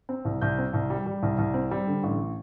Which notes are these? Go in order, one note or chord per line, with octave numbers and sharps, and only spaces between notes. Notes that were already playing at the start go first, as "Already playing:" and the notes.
C4
C2
C2 G6
C4
C2
G3
G3
C2
C2
C4
G3
D3
A1